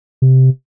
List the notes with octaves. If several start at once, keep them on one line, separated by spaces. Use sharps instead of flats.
C3